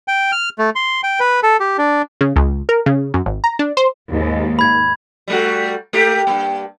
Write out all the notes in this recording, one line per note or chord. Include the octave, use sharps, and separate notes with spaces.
G5
F6
A3
C6
G5
B4
A4
G4
D4
C#3
C#2
A#4
C#3
F#2
G#1
A#5
D4
C5
D#2 G#2
B5 G#6
G3 A3 F#4
A3 A#3 G4
G2 A#3